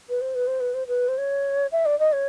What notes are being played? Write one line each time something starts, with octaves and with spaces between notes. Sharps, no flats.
B4
C5
B4
C5
B4
C5
B4
C5
C#5
E5
D5
D#5
C#5